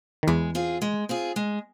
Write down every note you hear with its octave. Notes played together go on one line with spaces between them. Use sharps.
D#3
E2 E3 G#3
C4 F4 G#4
G#3
C4 F4 G#4
G#3